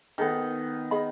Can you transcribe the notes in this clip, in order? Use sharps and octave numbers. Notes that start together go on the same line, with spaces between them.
D#3 B3 G#4 A4
G#4 D#5 B5